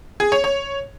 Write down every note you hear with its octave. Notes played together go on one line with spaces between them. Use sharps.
G#4
C#5
C#5